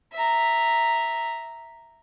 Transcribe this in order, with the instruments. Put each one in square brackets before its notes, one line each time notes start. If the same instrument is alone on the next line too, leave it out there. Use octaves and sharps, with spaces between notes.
[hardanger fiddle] E5 A#5